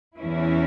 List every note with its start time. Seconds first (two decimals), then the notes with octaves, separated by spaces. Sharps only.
0.18 E2 E3 C#4 E4